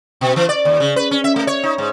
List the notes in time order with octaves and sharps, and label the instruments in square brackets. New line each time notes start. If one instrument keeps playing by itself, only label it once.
[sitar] B2
E3
D5
D#2
C#3
B4
C#4
E5
A3
C#5
D#4
G#2